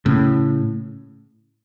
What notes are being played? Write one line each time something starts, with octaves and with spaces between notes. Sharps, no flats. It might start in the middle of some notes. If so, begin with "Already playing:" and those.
A2 C#3